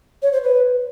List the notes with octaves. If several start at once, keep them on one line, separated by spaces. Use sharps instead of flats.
C#5
C5
B4